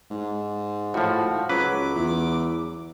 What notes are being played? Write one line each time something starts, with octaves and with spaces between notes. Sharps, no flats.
G#2
A2 F3 F#4
C#2 F#3 B4 D6
E2